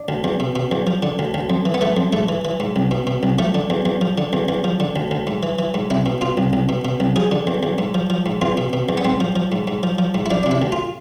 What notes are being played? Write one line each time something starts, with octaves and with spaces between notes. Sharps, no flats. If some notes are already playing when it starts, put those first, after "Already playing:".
Already playing: D4
D2
E2
B2
B2
E2
F3
D3
D2
D2
F2
E3
B3
E3 A3
F2
G#2 A3
E3
E3
G#2
C2
B2
B2
C2
F3 A3
D3
E2
E2
F3
D3
E2
E2
F3
D3
D2
D2
G#2
E3
E3
G#2
C2 E4
B2
B2 F4
C2
C2
B2
B2
C2
F3 G#4
D3
E2
E2
G#2
F3
F3
G#2
E2 F4
B2
B2
E2
B3
G#2 C4
F3
F3
G#2
G#2
F3
F3
G#2
E4
F3 D4
D4
C3
E4
D2
F4